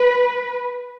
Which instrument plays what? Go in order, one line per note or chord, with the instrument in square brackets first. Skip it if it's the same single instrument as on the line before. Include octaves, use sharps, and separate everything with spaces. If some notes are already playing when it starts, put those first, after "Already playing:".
Already playing: [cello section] B4